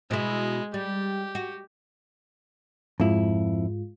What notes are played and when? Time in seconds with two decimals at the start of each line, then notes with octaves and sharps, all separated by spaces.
0.11 B2 G#3 E4
0.74 G3 G4
1.35 F#4
3.00 F2 G#2 G#3 E4 F4